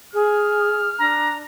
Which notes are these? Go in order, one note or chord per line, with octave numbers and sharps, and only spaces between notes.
G#4 F6
D4 A#5